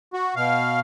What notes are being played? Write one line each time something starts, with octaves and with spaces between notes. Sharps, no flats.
F#4
B2 F5